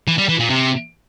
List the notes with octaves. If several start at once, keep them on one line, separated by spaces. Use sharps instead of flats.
E3
G3
E3
A#2
C3